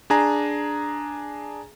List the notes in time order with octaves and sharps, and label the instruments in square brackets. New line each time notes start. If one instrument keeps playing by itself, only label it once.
[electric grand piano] D4 G#4 G#5 A#5